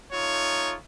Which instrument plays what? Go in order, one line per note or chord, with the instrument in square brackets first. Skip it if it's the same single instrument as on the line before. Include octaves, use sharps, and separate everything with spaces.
[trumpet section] A3 D#4 F4 C#5